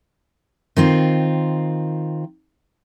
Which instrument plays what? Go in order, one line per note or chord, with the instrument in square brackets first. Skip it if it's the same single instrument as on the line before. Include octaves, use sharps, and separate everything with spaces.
[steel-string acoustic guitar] D#3 C4 F4